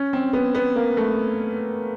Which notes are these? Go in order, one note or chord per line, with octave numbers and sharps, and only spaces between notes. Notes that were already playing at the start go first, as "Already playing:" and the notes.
Already playing: C#4
C4
B3
B3
A#3
A3